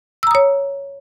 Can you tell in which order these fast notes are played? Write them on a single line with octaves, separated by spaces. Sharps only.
E6 A#5 D#6 C#5